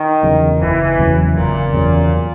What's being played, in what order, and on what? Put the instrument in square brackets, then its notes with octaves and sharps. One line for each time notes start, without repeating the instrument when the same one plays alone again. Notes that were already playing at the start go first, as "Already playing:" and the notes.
Already playing: [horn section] D#3
[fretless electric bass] E2 C#3 F#3
[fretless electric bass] F#1 [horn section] E3
[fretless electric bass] E2 C#3 F#3
[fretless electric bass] F#1 [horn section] A#2
[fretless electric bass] E2 C#3 F#3